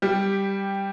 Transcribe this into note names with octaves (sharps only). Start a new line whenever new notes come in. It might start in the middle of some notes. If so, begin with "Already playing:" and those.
G3 G4